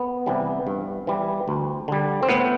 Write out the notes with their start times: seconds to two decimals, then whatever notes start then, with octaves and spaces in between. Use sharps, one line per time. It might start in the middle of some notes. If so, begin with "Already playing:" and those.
Already playing: B3
0.26 C3 E3 G3
0.67 G2
1.07 E3 G3
1.48 D2
1.88 D3 G3
2.23 C4
2.29 A2 B3